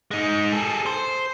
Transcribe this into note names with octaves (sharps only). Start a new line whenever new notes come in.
G#3 D#4
G#4 A4
C5